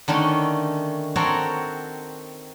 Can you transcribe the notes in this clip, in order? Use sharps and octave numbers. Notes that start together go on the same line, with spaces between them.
D3 D#3 A3 C#4
C4 F#4 A4 A#4 C#5 F#5